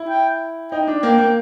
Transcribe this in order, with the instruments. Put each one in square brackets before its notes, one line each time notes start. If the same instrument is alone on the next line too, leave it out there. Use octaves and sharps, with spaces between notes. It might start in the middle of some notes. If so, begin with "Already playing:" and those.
Already playing: [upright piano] E4
[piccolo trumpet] G5
[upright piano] D#4 [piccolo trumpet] G5
[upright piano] D4
[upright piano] A#3 [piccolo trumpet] G5
[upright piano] A#3